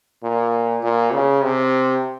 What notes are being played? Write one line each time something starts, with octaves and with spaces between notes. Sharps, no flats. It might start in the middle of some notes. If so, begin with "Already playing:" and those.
A#2
A#2
C#3
C3